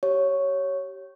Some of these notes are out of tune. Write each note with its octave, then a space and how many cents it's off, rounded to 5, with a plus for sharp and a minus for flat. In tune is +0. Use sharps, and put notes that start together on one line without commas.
G4 -25 C#5 +0